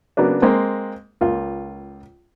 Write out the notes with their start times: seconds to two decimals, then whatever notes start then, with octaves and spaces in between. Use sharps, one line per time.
0.17 C#3 F#3 A#3 B3 D4
0.42 G#3 A#3 C4
1.21 C#2 A#3 F4